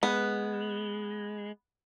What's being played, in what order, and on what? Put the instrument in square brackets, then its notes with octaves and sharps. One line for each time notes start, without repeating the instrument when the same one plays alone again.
[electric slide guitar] G#3 [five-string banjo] B3